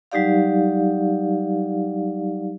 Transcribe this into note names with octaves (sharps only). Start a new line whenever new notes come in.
F#3 G3 D#4 G4 D5 F5